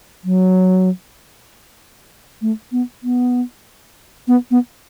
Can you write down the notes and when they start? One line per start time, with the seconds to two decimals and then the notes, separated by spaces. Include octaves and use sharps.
0.24 F#3
2.42 A3
2.72 B3
3.03 B3
4.28 B3
4.51 B3